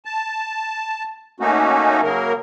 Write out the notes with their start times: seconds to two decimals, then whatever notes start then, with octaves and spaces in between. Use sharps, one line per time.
0.05 A5
1.40 A3 A#3 C#4 D#4 F#4
2.03 C#3 F#3 A#3 A#4